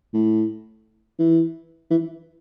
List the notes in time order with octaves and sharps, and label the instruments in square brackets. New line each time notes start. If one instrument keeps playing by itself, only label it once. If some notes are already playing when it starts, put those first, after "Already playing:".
[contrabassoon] A2
E3
E3